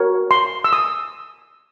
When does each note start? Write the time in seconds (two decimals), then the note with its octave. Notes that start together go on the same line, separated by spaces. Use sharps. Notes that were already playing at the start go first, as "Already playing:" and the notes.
Already playing: F#4 A#4 C#5
0.31 C6
0.64 E6
0.73 D#6